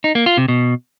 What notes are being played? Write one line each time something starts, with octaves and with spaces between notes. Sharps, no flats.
D#4
A#3
F4
C3
B2